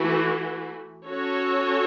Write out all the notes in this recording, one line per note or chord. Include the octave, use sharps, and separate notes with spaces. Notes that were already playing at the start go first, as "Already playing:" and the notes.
Already playing: E3 A3 F#4
C#4 F#4 A4 C#5